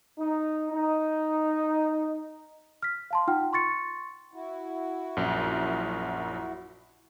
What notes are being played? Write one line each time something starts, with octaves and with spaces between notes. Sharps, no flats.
D#4
D#4
F6 B6
F5 A5 C6
D#4 F4 F#5 G5 F6
C6 C#6 A6 C#7
E4 F#4
A#1 F#2